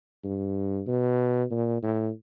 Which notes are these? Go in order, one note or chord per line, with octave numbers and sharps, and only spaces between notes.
G2
B2
A#2
A2